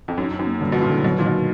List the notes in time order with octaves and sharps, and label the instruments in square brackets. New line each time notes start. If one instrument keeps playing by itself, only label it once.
[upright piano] F2
[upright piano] F#2 [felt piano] D#4
[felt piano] D#4
[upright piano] F#2
[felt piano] A#3
[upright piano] G2 [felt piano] D3
[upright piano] B2 [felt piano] F3
[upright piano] A#2
[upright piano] A2 [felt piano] D3
[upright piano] B2 [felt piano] F#3
[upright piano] A#2 [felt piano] D#3
[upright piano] B2